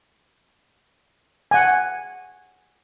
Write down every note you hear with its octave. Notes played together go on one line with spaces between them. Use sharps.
F#5 G#5